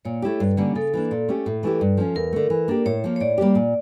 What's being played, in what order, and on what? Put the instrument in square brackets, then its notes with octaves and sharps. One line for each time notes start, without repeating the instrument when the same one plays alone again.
[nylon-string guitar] A#2 [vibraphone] C#5
[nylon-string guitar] A3 E4 G4
G2
D3 G3 A#3 C#4
[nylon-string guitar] C#3 [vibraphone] A4
[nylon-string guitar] E3 A#3 D4
A#2
A3 C#4 G4
A2
E3 A3 E4 G4
G2
F3 C#4
[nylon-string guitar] E2 [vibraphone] A#4
[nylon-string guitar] D3 A3
E3
A#3 D4 G4
[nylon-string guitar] A2 [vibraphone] C#5
[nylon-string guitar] F3 A#3
[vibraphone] C#5
[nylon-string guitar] A2 [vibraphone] D5
[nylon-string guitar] G3 A#3 D4 G4
A#2